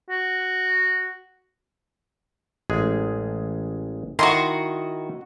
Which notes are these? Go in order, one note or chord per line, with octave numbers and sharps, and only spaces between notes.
F#4
A1 G#3 G#4
D#3 E4 F#4 D#5 A#5 C6